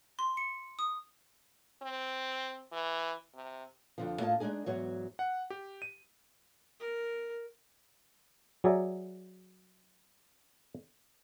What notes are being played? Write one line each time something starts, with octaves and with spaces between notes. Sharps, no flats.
C6
C#7
D#6
C4
E3
C3
F2 D3 F3
A2 A#3 F4 D#5 A5
G#3 A3 D4 D#4 G#4
E2 G#2 F#3 C#5
F#5
G4
D#7
A#4
F#3 G#4 D5 E5 A#5